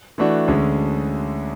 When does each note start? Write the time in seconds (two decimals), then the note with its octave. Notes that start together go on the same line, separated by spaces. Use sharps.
0.18 E3 A3 D4 F#4
0.48 D2 D3 G#3 C#4